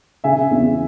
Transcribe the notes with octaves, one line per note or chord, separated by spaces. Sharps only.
C#3 E5 G#5
E2